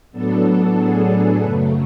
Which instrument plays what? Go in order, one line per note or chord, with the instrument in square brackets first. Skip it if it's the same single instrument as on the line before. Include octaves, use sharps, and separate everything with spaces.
[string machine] A2 F#3 B3 D4 A4
G#4
A4
F#2 C#3 F#3 A3 A4 B4